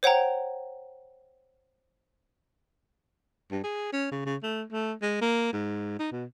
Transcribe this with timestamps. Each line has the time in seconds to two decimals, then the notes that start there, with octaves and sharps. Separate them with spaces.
0.03 C5 C#5 F#5 G5 A#5
3.51 G2
3.63 G#4
3.92 C#4
4.12 C#3
4.25 C#3
4.43 A3
4.72 A3
5.02 G#3
5.21 A#3
5.53 G#2
5.99 D#4
6.12 B2